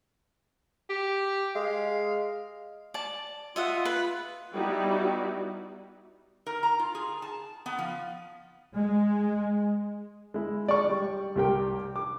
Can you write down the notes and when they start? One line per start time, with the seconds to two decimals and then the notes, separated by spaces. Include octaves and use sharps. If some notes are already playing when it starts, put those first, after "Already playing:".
0.90 G4
1.56 G#3 F5
2.94 D5 A5
3.56 F4 D#5 E5 F#5
3.85 B4
4.53 G3 B3 D#4 E4 F#4 G4
6.47 A#4
6.63 A#5
6.79 F4
6.95 G#4
7.22 A5
7.66 B3
7.79 F3
8.73 G#3
10.34 G#3 E4
10.68 D5 C#6
10.90 G3
11.35 C2 G3 G4 A#4 G5
11.96 D6